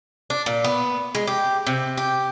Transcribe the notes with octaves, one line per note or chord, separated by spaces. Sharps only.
D4
A#2
B3
G#3
G4
C3
G4